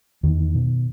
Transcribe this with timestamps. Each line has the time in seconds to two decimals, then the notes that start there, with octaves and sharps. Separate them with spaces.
0.23 E2 D#3
0.55 B2